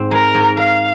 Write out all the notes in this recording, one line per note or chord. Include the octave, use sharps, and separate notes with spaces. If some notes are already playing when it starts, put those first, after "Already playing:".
Already playing: G#2 C4
G#3 A#4
G#2
A#4 F5